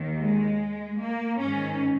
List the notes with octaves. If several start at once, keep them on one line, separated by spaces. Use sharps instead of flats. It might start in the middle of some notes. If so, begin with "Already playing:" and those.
Already playing: D#2 D#3
G#3
A#3
G#2 D#3 C#4